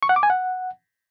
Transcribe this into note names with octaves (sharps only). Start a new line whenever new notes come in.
C#6
F#5
D6
G#5
F#5